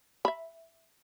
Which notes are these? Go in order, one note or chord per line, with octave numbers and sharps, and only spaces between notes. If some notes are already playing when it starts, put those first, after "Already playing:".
E5 B5